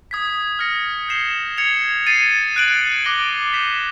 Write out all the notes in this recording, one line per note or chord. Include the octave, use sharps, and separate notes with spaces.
D#6 G#6 B6
F6 A#6 C#7
G6 C7 E7 G7
G#6 C#7 F7
A6 C7 D#7
F#6 A6 D7 F#7
D6 F#6 A#6 D7 G7
G6 B6 E7